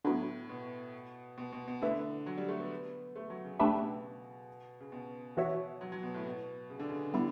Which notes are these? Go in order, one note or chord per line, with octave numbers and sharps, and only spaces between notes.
A2 D3 F#3 B3
B2
B2
B2
B2
D3 A3 E4 B4 E5
F#3
G3
A3
B3
A3
F#3
C#3
B2 A3 D4 G4 B4 E5
C#3
B2
C#3
B2
E3 B3 F#4 C#5 E5
F#3
F#3
B2
A2
B2
C#3
D3
C#3
D3 G3 B3 E4